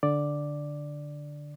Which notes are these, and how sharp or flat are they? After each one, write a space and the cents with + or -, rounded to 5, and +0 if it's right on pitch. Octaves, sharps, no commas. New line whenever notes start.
D3 +0 D5 +0